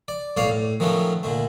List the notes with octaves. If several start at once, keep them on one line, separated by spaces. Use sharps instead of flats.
D5
B1 A2 C#5 D5 F5
A2
D#3 F3 F#3 A3 B3 C#4
A#2 D3 A3